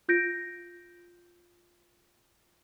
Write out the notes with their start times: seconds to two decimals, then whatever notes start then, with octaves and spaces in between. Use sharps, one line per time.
0.08 F4 G6 A#6 D7